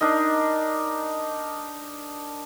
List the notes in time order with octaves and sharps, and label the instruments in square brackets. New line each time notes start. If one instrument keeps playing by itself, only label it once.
[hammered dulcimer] D4 D#4 A#4 D#5